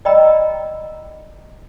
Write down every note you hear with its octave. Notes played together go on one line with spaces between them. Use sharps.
D5 D#5 G5 A#5 B5 E6